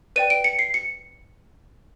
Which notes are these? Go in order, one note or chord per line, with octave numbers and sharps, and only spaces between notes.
B4 D5 G5 D#7
D7
C#7
C7
C#7